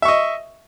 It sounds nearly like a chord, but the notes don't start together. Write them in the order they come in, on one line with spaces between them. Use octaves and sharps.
E5 C#6 D#5